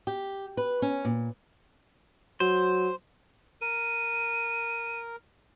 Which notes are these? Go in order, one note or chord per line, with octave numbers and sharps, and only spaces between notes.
G4
B4
C#4
A#2
F#3 C5
A#4 D#7